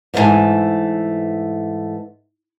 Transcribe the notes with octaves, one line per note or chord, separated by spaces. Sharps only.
G#2 E3 A3 A#4 F#5 G#5